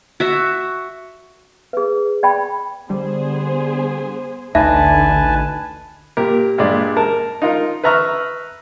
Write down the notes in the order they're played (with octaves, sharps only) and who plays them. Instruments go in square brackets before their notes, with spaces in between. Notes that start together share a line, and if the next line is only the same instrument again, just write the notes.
[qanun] F#4 E5
[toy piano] G#4 B4
D5 G5 B5
[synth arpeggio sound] D3 G3 [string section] B3 G#4 C5
[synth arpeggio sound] A1 D2 D#4 [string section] D3 [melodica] B4 G#5 A5 [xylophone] E5
[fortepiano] A#2 G4 A#4
G2 A#2 G#3 D5
A#4 A5
D#4 F4 A#4
B4 E5 A#5 C#6 F6